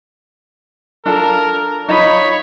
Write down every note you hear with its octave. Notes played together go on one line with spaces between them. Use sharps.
D4 F4 A4 A#4
D#4 F4 C#5 D#5 B5